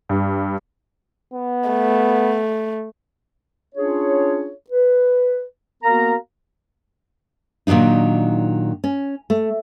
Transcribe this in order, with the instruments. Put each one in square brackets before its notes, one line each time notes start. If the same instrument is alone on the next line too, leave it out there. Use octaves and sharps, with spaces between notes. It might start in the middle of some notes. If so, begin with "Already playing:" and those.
[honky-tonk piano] G2
[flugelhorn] B3
[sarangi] A3
[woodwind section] C#4 D4 F4 G#4 C#5
B4
A#3 B3 F#4 A#4 F5 A#5
[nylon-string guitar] A#2 D#3 F#3 D4 D#4
C#4
A3